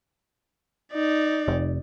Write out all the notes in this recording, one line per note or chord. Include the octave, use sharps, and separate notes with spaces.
D#4 D5
F1